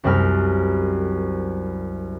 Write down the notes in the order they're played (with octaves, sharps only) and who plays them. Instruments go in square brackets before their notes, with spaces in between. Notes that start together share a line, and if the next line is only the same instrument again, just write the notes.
[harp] C2 F#2 G3 C4 F6